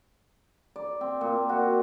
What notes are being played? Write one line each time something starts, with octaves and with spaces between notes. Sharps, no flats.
D5
C4
A#2
F#4